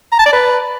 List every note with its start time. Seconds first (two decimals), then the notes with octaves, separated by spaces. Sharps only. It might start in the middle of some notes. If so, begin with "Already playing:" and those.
0.12 A#5
0.19 A5
0.26 D5
0.33 B4